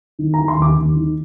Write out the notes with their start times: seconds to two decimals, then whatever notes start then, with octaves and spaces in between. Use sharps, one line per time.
0.19 D#3
0.34 D#3 A#5
0.48 C6
0.57 D#2
0.62 D6
0.77 D#2
0.96 D#3